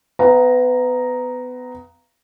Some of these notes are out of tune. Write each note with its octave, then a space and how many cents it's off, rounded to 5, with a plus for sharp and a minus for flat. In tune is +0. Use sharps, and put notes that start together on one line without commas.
B3 +25 F5 -30 A#5 +0